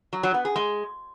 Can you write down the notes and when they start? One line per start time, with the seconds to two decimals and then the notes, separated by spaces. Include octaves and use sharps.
0.13 F#3
0.23 F#3
0.34 B3
0.45 G#4
0.56 G#3